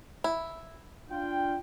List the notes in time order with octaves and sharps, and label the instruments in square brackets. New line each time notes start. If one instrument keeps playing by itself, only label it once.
[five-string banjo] E4
[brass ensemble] D4 F4 G5